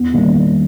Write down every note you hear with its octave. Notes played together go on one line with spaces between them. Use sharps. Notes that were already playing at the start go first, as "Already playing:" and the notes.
Already playing: E2
D#3 G3 A#3